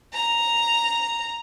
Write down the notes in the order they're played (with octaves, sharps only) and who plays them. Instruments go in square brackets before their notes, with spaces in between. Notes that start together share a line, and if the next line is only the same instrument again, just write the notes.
[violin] A#5